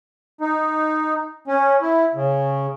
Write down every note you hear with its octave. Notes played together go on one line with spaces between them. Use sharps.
D#4
C#4
E4
C#3